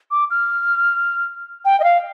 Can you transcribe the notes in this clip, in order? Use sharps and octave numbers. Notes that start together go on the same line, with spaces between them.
D6
F6
G5
D#5
F5